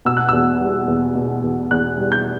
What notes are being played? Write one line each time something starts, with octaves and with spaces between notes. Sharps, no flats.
B2 E6
F#6
E2 E6
G3
E2
B2
E2
E2 F#6
G3
G6